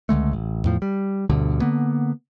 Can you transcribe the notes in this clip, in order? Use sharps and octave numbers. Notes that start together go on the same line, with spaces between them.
C#2 D3 G#3 A3
A1
E2 A2 F3
G3
D2 G2 B2 D3
D3 A#3 B3